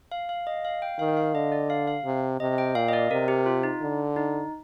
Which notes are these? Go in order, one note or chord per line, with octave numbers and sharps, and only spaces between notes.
F5
F5
D#5
F5
G5
D#3 F5
F5
D3 D#5
D5
F5
F5
C3
C3 D#5
G5
A#2 F5
D#5
D5
C3 A#4
G4
F4
D#4
D3
D#4